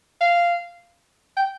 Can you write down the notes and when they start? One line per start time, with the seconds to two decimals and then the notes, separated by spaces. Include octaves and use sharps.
0.20 F5
1.37 G5